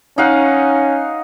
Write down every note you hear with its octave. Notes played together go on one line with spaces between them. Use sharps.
C#4 D#4 F5 F#5